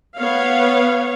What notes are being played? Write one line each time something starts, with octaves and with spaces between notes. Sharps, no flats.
B3 C#5 F5